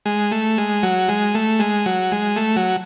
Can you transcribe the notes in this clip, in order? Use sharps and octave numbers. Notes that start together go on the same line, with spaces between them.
G#3
A3
G#3
F#3
G#3
A3
G#3
F#3
G#3
A3
F#3